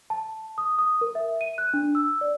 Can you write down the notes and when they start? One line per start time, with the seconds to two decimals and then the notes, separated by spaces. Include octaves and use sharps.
0.10 A5
0.58 D#6
0.79 D#6
1.01 A#4
1.15 E5
1.41 D#7
1.58 F#6
1.74 D4
1.95 E6
2.21 D5